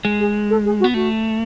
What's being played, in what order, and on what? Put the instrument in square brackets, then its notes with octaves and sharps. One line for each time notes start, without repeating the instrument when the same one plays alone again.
[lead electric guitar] G#3
[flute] G#4
A4
G#4
F#4
[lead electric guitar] B3
[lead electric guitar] A3 [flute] F#4